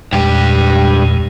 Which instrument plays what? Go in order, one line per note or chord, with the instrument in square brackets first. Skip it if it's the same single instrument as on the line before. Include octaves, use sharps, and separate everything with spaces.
[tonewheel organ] E2 A#2 G#3 [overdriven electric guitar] G2 G4